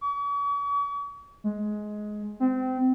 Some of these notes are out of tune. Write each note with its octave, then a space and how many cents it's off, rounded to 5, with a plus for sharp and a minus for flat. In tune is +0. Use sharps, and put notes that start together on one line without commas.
C#6 +45
G#3 +15
C4 -25